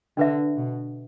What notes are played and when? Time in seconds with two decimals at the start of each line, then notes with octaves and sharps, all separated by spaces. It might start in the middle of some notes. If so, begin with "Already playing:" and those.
0.17 D3 D4 B4 E5
0.56 B2